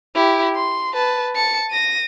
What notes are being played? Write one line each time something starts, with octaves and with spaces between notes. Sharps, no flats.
E4 G4
C6
B4 A5
A5 C#7
A#6 D#7